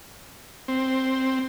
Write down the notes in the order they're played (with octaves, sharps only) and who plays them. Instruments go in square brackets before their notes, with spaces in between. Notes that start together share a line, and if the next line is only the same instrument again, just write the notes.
[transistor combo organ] C4